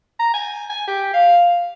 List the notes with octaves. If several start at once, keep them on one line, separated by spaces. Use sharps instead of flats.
A#5
G#5
G#5
G4
F5